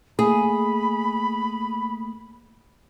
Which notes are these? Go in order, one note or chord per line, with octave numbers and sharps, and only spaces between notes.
A3 A#3 G#4 B5 D#6